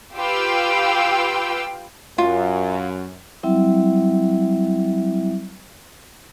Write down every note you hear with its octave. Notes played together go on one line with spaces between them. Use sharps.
F4 G4 B4 F5 G5 E6
F#2 F4
F#3 G3 C4 E4 E5